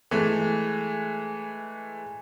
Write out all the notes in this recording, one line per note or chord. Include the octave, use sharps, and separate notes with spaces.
E3 G#3 A3